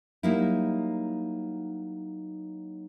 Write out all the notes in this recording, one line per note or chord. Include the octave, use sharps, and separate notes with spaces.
F#3 G3 A#3 D#4 E4